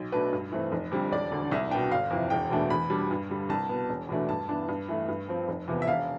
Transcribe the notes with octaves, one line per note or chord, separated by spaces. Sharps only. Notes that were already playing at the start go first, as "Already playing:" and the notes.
Already playing: B1
B2 A3 D4 B4
G2
E3 A3 C4
F1
F2 D3 G3 C4
E1 D5
D2 D3
C2 E5
B2 B3 D4 G5
G1 F5
F2 C3 E3
E1 G5
E2 B2 A3 D4
E2 B5
B2 G3 D4
G2
D3 G3
C2 A5
B2 B3
E1
E2 B2 A3 D4
G2 A5
E3 B3 D4
G2
E3 A3
G2
F3 C4
F1
E2 C3 F3 B3
E5
E1 F5